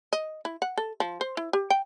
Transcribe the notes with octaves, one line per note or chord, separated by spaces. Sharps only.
D#5
E4
F#5
A4
F3
C5
E4
G4
G5